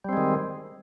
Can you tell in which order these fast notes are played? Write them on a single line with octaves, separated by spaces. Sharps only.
G3 C4 G#3 D#3